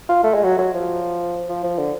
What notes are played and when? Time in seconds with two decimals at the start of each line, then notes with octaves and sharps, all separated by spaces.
0.09 F4
0.23 A3
0.34 G#3
0.43 F#3
0.58 F#3
0.74 F3
1.49 F3
1.63 F3
1.78 D3